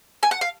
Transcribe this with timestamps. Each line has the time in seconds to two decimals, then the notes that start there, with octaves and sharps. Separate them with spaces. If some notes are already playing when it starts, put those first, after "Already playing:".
0.23 G#5
0.31 F#5
0.41 F5